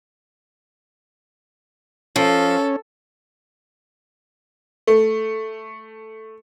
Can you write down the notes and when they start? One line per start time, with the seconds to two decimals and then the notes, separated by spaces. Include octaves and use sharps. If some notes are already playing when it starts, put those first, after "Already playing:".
2.16 F3 C#4 A4
4.87 A3